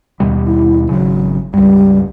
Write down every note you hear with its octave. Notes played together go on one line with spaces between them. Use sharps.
D#2 B2 G3
E4
G#1 C#3 F#3
C#2 G2 G3